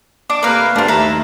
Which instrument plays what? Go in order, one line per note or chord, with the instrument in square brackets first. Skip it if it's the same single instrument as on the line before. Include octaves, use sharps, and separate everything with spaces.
[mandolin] D4 [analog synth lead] D6
[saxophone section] C3 A3 A#3 [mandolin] B4 F5
[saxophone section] D2 G2 [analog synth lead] A3 [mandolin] D4 F4
[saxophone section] D#2 [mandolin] B4 E5 A#5